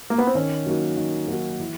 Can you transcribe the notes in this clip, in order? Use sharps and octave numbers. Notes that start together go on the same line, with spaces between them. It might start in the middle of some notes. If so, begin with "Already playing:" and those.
A#3
B3
C4
D#3 C#4
F#3 A#3 D#4 F#4
D#3
F#3 A#3 D#4 F#4
E3